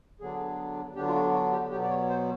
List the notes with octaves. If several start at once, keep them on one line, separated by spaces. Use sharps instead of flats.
D3 F#3 B3 D4 G#4
D3 F#3 B3 D4 G4
F4
F#4
F#4
G4
B2 F#3 B3 G4
D5
C#5
C5